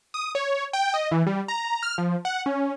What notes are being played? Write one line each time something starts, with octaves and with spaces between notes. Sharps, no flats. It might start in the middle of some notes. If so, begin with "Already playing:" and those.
D#6
C#5
G5
D#5
E3
G3
A#5
F6
F3
F#5
C#4